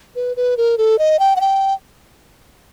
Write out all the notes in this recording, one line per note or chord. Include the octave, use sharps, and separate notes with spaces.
B4
B4
A#4
A4
D#5
G5
F#5
G5